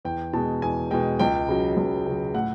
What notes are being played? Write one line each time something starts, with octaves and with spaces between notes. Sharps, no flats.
E2 G5
B2 G#3 A5
E2 G#5
B2 G#3 G5
C#2 G5
C#3 F#3
C#2
C#3 F#3
A2 F#5